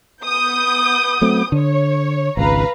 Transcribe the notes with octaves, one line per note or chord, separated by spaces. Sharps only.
B3 D#6 G6
F#3 A3 C4
D3 C#5
G#1 C#2 B4 F5 A#5